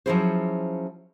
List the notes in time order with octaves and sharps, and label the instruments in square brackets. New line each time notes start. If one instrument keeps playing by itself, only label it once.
[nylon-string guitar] F3 F#3 C#4 E4 G#4 C5